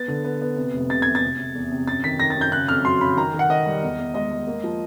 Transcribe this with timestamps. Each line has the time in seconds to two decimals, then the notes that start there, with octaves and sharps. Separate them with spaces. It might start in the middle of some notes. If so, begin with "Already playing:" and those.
Already playing: B3 A6
0.08 D3
0.24 B3
0.41 B3
0.57 C3
0.73 F1
0.89 C3 A6
1.02 E2 G#6
1.15 A6
1.23 C3
1.38 C3
1.55 E2
1.72 C3
1.87 F#2 A6
2.04 D#3 B6
2.20 D#3 A#6
2.30 A6
2.36 F#2
2.41 G6
2.52 C#3 F#6
2.68 F2 F6
2.85 F#3 C6
3.01 C#3 B5
3.17 D#3 A#5
3.34 D#3
3.39 F#5
3.50 D#3 D#5
3.66 G3
3.83 E2
3.98 E2
4.14 G#3 D#5
4.32 G#3
4.47 A#3
4.64 F3